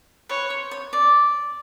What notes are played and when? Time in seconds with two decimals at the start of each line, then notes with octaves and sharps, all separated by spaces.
0.29 B4 C#5
0.50 C5
0.71 C#5
0.93 D5